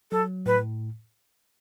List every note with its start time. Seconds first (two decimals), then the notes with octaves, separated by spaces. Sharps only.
0.11 F#3 A4
0.46 A2 B4